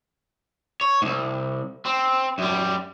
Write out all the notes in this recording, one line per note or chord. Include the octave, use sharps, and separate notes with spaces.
C#5
C2 G#2
C4
F#2 G3